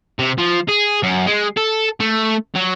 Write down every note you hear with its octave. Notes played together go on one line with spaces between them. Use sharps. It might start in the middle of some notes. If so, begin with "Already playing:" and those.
C3
F3
G#4
F#2
G#3
A4
A3
F#3